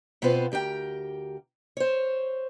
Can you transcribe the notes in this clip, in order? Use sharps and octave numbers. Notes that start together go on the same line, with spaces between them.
B2 B3 C4 F4 B4 C5
D2 G4 A#4 G5
C5 C#5